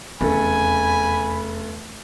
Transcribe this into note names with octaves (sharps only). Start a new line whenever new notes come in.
F1 E2 C#3 A4 G#5 B5